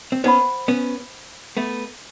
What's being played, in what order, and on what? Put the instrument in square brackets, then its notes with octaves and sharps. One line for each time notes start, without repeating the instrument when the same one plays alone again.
[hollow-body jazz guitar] C4
[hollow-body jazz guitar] B3 C#4 [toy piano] C5 D#5 F#5 B5
[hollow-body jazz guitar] B3 C#4
A3 B3